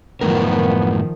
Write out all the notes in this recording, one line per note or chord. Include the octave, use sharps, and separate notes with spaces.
F#2 A2 D#3 F3 B3 A#4